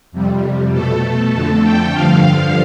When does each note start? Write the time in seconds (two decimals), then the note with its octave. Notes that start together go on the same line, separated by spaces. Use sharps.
0.12 F2 C3 G3
0.73 B2 A3 A4
1.33 F2 D3 A3 A4
1.64 G5
1.94 G2 D3 F3 F5